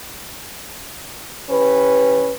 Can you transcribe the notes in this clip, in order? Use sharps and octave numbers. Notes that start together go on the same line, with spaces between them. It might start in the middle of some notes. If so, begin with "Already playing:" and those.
E3 C#4 G4 B4